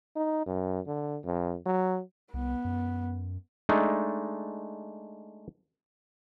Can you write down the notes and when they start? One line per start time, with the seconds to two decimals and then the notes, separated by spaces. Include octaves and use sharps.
0.16 D#4
0.46 F#2
0.87 D3
1.25 F2
1.66 F#3
2.34 C2 B3
2.64 F#2
3.69 G#3 A3 D4 D#4